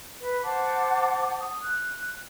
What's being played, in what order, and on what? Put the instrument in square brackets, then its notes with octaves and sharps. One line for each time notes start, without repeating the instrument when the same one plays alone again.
[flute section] B4
C5 F#5 A5 D6
D#6
F#6